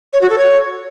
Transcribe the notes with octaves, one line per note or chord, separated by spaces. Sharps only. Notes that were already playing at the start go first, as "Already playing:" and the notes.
C#5
F#4
A4
C#5